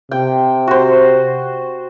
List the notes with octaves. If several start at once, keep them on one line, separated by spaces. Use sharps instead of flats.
C3 G5
F#4 C5